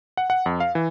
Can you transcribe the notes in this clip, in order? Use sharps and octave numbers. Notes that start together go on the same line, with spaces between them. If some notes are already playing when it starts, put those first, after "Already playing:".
F#5
F#5
F2
F5
E3